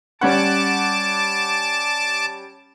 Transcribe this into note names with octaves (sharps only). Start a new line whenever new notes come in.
G3 C#4 F#5 A5 D6